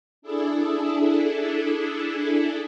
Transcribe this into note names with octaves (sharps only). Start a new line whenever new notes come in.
D4 E4 G#4 A4